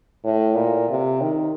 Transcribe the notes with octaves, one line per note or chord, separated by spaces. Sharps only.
A2
A#2
C3
D#3